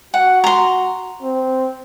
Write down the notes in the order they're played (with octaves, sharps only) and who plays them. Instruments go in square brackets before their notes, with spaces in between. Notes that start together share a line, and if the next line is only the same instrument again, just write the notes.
[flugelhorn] F#4 [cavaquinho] F#5
[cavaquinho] A#5 C6
[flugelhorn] C4